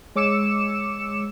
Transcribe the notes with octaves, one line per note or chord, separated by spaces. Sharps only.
G#3 C#5 D6 E6 C#7 E7